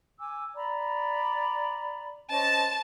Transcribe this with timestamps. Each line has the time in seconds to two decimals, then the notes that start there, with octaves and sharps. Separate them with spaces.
0.19 G#5 D6 E6
0.56 D5 A#5 B5
2.30 C#4 C5 D#5 A5